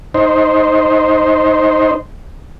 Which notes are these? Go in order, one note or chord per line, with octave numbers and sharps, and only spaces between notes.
D#4 C5